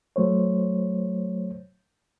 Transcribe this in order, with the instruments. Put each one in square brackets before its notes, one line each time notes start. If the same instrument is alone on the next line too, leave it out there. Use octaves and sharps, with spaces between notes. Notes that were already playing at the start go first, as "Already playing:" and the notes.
[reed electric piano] F#3 A3 C5 C#5